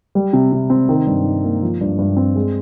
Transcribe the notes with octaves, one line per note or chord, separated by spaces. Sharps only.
G3
C3
C3
C4
D#3
G2
D#4
A#3
F3
G2
G2
C4
G#3